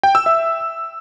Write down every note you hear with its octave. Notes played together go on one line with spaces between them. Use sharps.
G5
E6
E5